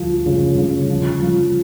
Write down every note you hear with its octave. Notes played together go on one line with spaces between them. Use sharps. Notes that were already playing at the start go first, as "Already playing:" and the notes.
Already playing: D2 F3
C#3
C#3
F3
F3